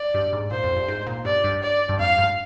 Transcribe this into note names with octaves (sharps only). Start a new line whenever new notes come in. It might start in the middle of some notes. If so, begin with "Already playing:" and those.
Already playing: D5
G2
G#2
A#2 C5
F2
G2
G#2
A#2
G2 D5
G2
D5
G2
F2 F5
G2